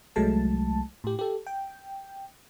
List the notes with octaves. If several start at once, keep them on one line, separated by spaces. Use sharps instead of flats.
C2 F#3 G#3 A3 A5
A2 G4
G4 A4
G5